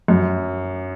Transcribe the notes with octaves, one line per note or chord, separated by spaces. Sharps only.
F#2